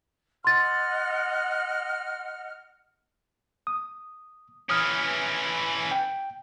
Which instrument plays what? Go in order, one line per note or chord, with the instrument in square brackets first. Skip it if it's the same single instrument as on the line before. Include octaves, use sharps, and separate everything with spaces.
[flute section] D#5 F#5 F6 [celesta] C6 A6
[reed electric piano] D#6
[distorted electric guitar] E3 C#4 [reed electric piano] D#6 F6
[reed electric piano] G5